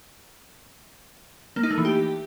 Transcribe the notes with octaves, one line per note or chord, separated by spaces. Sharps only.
A#3
D#4
A3
E3
G4